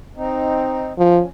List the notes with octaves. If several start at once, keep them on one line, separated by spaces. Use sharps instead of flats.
C4 D#4
F3 C#4